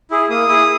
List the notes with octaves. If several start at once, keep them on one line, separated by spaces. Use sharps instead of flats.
E4 G#4
A#3 D#6
E4 G#4